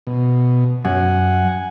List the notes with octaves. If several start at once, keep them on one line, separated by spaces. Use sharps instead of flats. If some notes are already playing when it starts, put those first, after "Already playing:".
B2
F#2 F#5 G#5